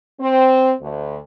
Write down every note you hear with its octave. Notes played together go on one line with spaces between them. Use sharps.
C4
D2